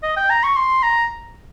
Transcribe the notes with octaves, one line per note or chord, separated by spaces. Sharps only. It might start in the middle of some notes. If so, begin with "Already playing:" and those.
D#5
G5
A#5
C#6
C6
A#5